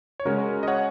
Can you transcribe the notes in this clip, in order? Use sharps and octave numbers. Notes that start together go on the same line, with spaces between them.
C#5
C#3 G#3 C#4 F#4 A#4
D#5
C#5 F#5